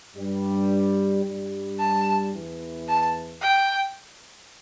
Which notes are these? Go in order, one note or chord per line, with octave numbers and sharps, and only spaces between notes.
G2 G3
G2 G3
A5
E2 E3
A5
G5